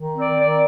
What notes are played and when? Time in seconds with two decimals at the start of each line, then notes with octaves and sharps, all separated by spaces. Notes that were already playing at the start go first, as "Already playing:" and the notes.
Already playing: D#3
0.16 C4 D5
0.38 D#3 D5